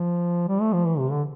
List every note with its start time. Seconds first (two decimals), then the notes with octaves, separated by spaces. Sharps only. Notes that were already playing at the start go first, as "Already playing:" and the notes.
Already playing: F3
0.48 G3
0.61 A3
0.73 F3
0.86 E3
0.99 C3
1.11 D3